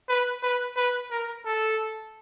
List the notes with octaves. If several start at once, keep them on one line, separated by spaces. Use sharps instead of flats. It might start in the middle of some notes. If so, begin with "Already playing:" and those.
B4
B4
B4
A#4
A4